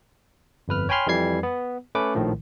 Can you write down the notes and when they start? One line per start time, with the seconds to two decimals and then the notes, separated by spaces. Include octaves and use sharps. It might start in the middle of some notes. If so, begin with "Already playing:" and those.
0.68 G1 F2 B4 F6
0.89 C#5 G5 G#5 B5 C6 F6
1.07 F2 E3 G3 G#6 C7
1.43 B3
1.95 A3 C#4 B4 D6
2.15 A#1 A2 D#3 F3